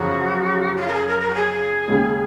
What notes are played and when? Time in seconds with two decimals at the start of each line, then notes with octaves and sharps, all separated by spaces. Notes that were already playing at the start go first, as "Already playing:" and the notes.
Already playing: F#2 C#3 F3 F#4
0.77 F#4
0.81 F4
0.88 A#4
0.94 G#4
1.08 A#4
1.20 A#4
1.30 F#4
1.34 G#4
1.88 D#2 C#3 G#3